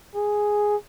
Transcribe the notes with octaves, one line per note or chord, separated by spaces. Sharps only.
G#4